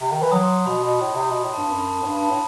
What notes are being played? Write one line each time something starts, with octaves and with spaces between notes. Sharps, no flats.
C3
D#3
E3
F#3 D#6
C6
B2 B5
B2
A2
C3 D#6
B2 C6
B5
A2
A5
G2
F#2 B5
B5
A5
A2
G2 B5
A5
B5
A2